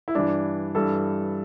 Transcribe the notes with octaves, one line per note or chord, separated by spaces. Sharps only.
E4
G2 E3 D4
G2 E3 A4